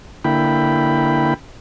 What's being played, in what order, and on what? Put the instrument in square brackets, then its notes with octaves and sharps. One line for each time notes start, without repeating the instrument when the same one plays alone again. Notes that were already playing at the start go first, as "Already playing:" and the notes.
[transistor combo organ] D3 A#3 E4 G5 B5